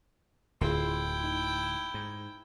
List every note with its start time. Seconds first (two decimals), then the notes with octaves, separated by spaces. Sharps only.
0.61 D1 D2 E4 F4 G#4 G5 C6
1.24 D#4
1.94 G#2